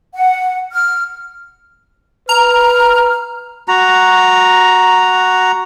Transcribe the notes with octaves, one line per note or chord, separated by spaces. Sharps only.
F#5
F6
B4 A#5 F6
F#4 A#5